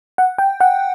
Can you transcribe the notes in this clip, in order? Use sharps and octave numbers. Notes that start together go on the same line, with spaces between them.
F#5
G5
F#5